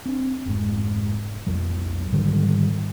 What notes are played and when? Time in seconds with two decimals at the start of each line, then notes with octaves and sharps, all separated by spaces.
0.06 C4 D4
0.46 F1 G#2
1.47 B1 F2 F#3
2.12 G#2 D3 D#3 G3